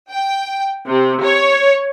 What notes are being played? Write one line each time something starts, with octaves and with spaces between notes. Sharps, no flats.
G5
C3
C#5